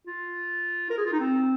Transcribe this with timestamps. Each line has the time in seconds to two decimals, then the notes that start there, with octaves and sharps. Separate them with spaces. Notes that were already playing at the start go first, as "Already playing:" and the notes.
0.07 F4
0.90 A#4
0.97 G#4
1.05 F4
1.12 D#4
1.20 C4